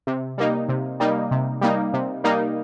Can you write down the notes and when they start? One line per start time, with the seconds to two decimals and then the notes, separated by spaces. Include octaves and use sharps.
0.07 C3
0.38 G3 A#3 D#4
0.69 C3
1.00 G3 A#3 D#4
1.31 C3
1.61 G3 A#3 D#4
1.94 C3
2.24 G3 A#3 D#4